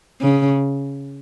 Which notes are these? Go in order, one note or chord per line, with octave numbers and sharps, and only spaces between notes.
C#3